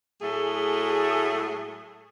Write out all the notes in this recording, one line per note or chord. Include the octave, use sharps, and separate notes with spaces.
A2 F#3 A3 G#4